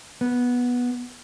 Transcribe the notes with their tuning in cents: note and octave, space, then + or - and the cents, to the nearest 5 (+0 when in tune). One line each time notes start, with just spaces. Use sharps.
B3 -10